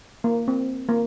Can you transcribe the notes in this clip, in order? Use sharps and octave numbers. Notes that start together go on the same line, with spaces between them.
A#3
C4
A#3